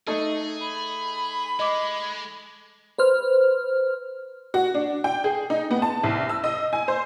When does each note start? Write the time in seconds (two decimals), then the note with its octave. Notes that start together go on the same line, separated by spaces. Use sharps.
0.07 A3 D#4 G#4 A4 D#5
0.60 B5
1.59 G#3 D#5 D6
2.98 B4 C5 F6
4.54 F#4
4.74 D4
5.04 G5
5.24 G#4
5.50 D#4
5.71 B3
5.82 A5
6.03 C2
6.29 E6
6.44 D#5
6.73 G#5
6.88 C5